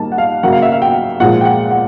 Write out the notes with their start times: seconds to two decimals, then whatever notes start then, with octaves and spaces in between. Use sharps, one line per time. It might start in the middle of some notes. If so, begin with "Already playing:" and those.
Already playing: D#3 G3 A#3 A5
0.12 F#5
0.18 F5
0.43 F#2 C#3 F#3 A#3 F#5
0.52 F5
0.62 E5
0.72 F5
0.82 G5
1.20 A#2 F3 G#3 F#5
1.41 G5
1.45 F#5
1.71 F#5